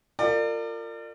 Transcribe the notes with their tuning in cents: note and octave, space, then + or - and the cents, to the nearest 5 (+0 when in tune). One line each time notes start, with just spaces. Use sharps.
F4 +0 A#4 -35 D5 +30